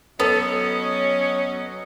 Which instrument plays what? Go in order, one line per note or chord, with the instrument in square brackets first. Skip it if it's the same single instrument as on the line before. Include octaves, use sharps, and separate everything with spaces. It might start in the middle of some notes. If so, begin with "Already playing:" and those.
[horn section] F#3 D#5 [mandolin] B3 [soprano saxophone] C#4 [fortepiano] A4